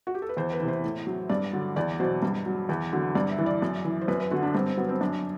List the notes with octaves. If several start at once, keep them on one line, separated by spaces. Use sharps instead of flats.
F#4
G4
A4
B4
E2 C5
B4
C3 E3
C5
A2
F#3
G2 D5
D3 F#3
E2 D5
B2 F#3 C5
G2
F#3
E2
D3 F#3
G2 D5
E5
E3
D5
F#2
E3
C5
F#2 B4
B4
D3 F#3 F#4
D4
G2 C4
C4
F#3 B3
C4
F#2 D4